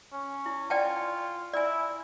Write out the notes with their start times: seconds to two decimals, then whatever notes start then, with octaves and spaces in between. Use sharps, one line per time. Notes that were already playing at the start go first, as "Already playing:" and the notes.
0.12 C#4
0.46 E4
0.70 F4 D5 G5 A5
1.53 E4 D5 G#5